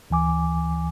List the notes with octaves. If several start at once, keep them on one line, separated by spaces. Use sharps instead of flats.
D2 E3 G#5 D6